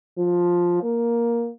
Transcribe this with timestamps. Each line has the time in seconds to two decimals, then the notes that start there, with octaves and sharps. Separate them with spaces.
0.18 F3
0.83 A#3